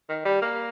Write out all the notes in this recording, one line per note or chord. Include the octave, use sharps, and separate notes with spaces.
D#3
G3
A#3